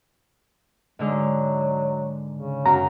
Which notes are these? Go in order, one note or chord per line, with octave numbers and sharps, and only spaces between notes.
G#2 D3 F#3 G#3
C#3
F#2 A#5